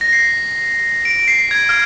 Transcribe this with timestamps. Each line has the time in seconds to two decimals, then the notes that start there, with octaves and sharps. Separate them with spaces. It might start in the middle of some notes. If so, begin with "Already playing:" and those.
0.01 A#6
0.13 C7
1.05 D7
1.28 C7
1.51 G#6
1.69 F6